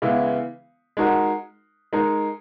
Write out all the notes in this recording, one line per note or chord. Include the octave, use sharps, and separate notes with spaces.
C#3 E3 G#3 B3 E4
G#3 D#4 F#4 A#4
G#3 D#4 A#4